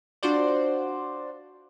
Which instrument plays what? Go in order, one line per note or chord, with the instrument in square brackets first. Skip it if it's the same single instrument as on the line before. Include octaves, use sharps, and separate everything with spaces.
[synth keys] D4 F4 F#4 C5 D5